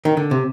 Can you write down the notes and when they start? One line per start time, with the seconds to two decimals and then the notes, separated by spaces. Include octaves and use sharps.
0.05 D#3
0.17 D3
0.31 C3